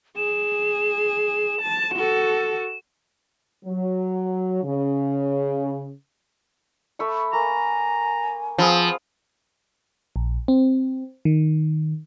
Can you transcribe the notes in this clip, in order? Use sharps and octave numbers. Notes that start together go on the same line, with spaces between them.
G#4 E7
A5
F#4 A4
F#3
C#3
A3 B5 C#6
A#3 G#5 A#5
F3 B3 C4 G#4
A#1
C4
D#3